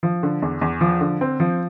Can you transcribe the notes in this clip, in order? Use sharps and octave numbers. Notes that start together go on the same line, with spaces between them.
F3
D3
E2
E2
F3
D3
C4
F3